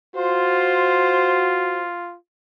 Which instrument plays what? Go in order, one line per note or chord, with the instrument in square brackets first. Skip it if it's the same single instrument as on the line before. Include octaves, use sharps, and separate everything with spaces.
[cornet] F4 [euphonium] F#4 [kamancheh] C5